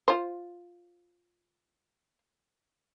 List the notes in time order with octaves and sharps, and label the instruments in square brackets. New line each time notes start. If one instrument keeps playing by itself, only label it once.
[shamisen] F4 C5